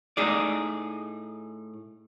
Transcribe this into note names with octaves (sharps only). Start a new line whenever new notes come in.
A2 D#4 G#4 D5